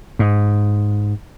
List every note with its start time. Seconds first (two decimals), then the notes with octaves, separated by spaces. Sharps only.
0.19 G#2